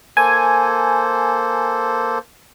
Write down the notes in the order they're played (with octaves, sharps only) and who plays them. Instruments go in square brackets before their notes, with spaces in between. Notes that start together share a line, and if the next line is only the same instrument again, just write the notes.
[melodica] A#3 A4 C5 [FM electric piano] G#5